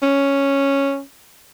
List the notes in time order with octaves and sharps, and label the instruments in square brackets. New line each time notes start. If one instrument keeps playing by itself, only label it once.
[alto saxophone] C#4